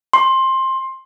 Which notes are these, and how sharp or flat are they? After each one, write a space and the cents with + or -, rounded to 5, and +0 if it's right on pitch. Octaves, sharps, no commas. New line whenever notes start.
C6 +15